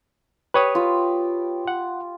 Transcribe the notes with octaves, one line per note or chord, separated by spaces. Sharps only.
G4 B4 C#5 D#6
F4 B5
F#5